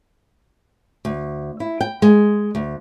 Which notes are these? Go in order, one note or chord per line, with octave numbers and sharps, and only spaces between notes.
D2
E4
G5
G#3
D2